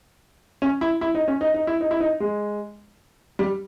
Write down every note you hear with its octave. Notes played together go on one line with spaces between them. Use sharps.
C#4
E4
E4
D#4
C#4
D#4
D#4
E4
D#4
E4
D#4
G#3
G3